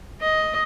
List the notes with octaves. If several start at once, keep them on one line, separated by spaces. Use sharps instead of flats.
D#5